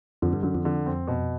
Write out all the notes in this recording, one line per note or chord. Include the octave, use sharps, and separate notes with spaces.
F2 D3
G2
F#2 D3
F2
D3
C4
B2